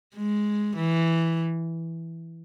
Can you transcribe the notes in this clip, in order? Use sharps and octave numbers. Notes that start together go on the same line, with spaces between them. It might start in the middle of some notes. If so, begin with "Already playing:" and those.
G#3
E3